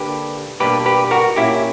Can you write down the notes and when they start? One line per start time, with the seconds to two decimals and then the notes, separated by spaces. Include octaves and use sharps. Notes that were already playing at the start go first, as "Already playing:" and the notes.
Already playing: D3 A#3 D4 G4 B4
0.60 B2 G3 A#3 D4 G4 B4
0.86 G4 B4
1.11 F#4 A#4
1.36 A#2 A#3 C#4 E4 G4